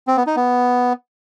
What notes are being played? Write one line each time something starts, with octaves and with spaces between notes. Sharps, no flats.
C4
B3
D#4
B3